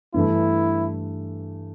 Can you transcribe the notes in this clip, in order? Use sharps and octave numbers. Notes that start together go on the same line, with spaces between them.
G2 E3 A3 E4